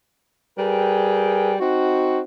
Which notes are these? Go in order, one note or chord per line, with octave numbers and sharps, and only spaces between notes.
G3 G#4 A#4 B4 G5
C4 D#4 F#4